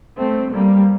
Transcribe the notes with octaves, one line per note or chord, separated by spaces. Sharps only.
G2 A3 C4
G3 A#3